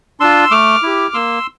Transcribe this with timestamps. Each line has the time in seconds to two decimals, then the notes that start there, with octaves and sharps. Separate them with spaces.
0.20 D4 F4 C6 E6
0.51 A3 D6 F6
0.83 E4 G4
1.14 A#3 C6 E6